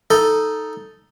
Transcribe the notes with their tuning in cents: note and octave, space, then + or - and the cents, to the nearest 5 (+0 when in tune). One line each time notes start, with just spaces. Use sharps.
D#4 +0 A4 +0